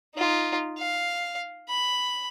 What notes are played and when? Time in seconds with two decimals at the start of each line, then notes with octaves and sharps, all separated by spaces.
0.16 D#4 F4
0.79 F5
1.69 B5